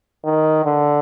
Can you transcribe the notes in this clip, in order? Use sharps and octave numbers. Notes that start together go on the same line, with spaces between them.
D#3
D3